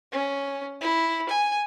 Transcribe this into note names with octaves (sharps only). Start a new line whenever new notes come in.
C#4
E4
G#5